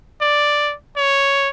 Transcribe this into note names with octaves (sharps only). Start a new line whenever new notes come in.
D5
C#5